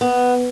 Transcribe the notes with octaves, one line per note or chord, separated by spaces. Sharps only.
B3